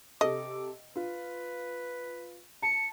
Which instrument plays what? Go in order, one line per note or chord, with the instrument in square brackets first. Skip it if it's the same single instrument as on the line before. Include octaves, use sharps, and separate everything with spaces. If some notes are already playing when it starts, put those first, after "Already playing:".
[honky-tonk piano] C3 A4 [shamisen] D#5 [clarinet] D6
[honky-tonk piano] F4 [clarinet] B4
[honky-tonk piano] A5 [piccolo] C#7